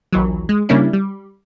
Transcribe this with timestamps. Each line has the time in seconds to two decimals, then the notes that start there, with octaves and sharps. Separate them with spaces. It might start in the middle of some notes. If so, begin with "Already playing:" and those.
0.13 A#1 D#2 E3 F#3
0.49 G#3
0.69 C#3 G3 A#3 C#4 D4 E4
0.93 G3